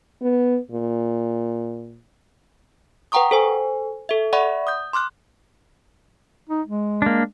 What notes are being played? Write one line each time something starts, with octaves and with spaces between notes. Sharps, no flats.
B3
A#2
B4 F#5 G5 A#5 C#6 D#6
A4 C5 G#5
A4 E5
D5 E5 F#5 B5 C#6
D#6 G6
C6 D6 F6 F#6
D#4
G#3
A#3 D4